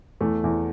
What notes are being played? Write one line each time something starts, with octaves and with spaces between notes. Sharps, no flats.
E2 A3
E2